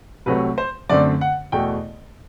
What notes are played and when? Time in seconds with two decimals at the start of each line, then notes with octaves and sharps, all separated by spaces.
0.26 C2 C3 F#3 A3 B4
0.58 C5
0.89 F#2 D3 A3 C4 D5
1.21 F#5
1.52 E2 B2 A3 G5